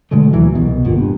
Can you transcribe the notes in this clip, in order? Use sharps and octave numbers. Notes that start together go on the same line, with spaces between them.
B2 D3 G#3 A3
D2 A#2 E3 F#3
C2 B2
G1 A#2
G2